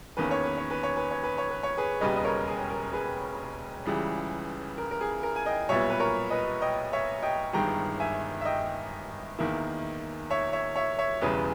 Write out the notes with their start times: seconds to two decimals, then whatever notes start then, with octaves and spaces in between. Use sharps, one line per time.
0.17 E2 D#3 A#3 C#4 B4
0.31 C#5
0.44 B4
0.58 C#5
0.71 B4
0.83 C#5
0.97 B4
1.11 C#5
1.23 B4
1.38 C#5
1.51 B4
1.63 C#5
1.77 G#4 B4
2.01 E1 D#2 C#3 G3 B4 D#5
2.16 D#5
2.24 A#4 C#5
2.48 G#4
2.70 A#4
2.93 G#4 B4
3.86 C#2 C#3 E3 G3
4.78 A#4
4.91 A#4
5.01 G#4
5.23 A#4
5.36 G#5
5.46 D#5 G5
5.69 B1 A#2 G3 B3 C#5 E5
5.90 B4
6.00 A#4 C#5
6.30 B4 D#5
6.61 D#5 G5
6.93 C#5 E5
7.23 D#5 G5
7.53 G1 G2 D#3 G#3 G5 A#5
8.00 E5 G#5
8.41 E5
8.45 D#5 G5
9.39 E2 D#3 A#3 E4
10.30 C#5 E5
10.53 C#5 E5
10.76 C#5 E5
10.99 C#5 E5
11.22 E1 E2 C#3 E3 G3 G#4 B4